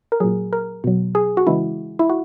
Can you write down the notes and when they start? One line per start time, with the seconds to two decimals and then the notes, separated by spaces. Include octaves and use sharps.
0.12 A#4
0.20 A#2 F#3 G#4
0.53 A#4
0.84 B2 F#3
1.15 G#4
1.37 F#4
1.47 C#3 E3 G#3 E4
1.99 E4
2.09 F#4